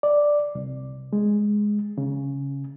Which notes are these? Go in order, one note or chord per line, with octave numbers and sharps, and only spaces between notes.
D5
C2
G#3
C#3